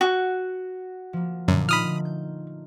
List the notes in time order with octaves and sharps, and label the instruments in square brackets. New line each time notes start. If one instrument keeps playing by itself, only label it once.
[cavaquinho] F#4 [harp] F#5
[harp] F3 A#3
[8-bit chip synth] F#2 [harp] A#2 D3
[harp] A3 D#4 F4 [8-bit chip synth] B5 D#6 F6
[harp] G6